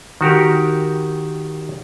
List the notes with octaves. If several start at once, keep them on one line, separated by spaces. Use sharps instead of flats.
D#3 F#4 G4 A#4